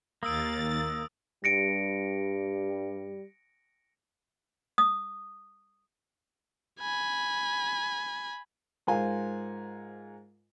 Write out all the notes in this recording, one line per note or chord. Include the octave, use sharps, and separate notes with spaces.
D#2 A#3 D#6 E6 A6 D7
G2 G3 A#6 C#7 D7
D#6
G#5 B5
G#2 F4 A#4 C5 F5 G#5